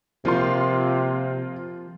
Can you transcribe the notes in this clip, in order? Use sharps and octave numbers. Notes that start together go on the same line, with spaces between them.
C3 F3 A#3 F4 C6